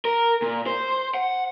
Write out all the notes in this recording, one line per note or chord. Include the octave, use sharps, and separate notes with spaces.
A#4
A#2
C5
F#5